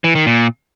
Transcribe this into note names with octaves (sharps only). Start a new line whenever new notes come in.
E3
D#3
A#2